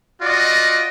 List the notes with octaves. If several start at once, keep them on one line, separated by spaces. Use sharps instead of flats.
F4 F#4 D5 D#5